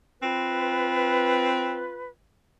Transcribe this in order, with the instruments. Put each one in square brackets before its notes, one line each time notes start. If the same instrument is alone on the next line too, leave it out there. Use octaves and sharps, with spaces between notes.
[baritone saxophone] C4 [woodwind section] F4 B4